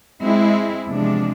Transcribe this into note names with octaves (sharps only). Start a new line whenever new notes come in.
G#3 C4 E4
E2 C3 F3 G#3 D4